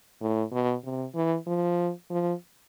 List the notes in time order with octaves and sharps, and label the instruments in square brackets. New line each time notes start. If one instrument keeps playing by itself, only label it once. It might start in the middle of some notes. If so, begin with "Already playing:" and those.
[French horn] A2
B2
C3
E3
F3
F3